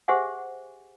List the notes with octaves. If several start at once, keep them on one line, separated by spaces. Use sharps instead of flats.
G4 G#4 C5 E5 F#5 G#5